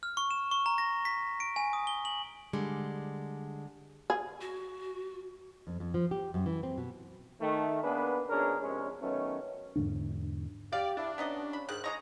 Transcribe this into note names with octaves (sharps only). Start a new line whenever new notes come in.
F6
C#6
E7
C#6
A#5
A#6
B6
D7
G#5
D#6
G7
F#7
D3 G3 G#3
G#4
F#4
F2
F2
F3
G4
F#2
E3
C4
B2
D#3 A3
A#3 B3 D4 G#4 B4
A#1 B2 C#4 D4 G#4 A#4
A#1 C3 G#3 C#4
D#3 F#3 A3 B3 C#4
E2 G#2 D3 D4
G4 D5 F5
D4 E4
B3 C#4 D#4 D#5
B5
G#2 D#3 G3 F#6
G#3 D#5 A#5 C#6